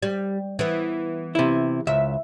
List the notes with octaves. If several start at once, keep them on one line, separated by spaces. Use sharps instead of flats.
G3
E3 B3
C3 E4
C#2 E5